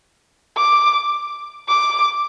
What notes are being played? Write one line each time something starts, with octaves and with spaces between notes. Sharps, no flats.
D6
D6